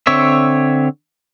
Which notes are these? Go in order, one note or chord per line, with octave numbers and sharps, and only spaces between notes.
D3 C4 C#5 E5